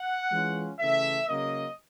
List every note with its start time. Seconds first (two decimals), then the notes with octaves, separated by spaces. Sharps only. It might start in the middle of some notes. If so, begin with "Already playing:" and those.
Already playing: F#5
0.32 E3 G#3 C#4 F4
0.79 C#3 E3 A3 E5
1.28 C#3 F#3 A#3 D#5